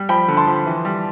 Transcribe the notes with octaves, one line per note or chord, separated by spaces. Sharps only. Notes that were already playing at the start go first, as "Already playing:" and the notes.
Already playing: G3
F3 G5 B5
D3
A5 C6
F3
E3
G3